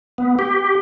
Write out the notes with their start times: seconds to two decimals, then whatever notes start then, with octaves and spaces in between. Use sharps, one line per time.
0.18 B3
0.39 G4